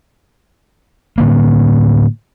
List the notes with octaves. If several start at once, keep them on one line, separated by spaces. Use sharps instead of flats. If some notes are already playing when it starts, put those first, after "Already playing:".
A2 D3 A#3